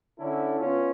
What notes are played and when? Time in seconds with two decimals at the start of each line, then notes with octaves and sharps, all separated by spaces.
0.19 D3 C#4 E4 A4
0.59 B3 C#4 F4